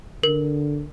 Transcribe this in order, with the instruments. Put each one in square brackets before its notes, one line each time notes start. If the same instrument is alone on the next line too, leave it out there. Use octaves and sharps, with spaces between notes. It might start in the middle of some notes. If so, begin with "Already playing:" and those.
[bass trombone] D3 [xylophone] A#4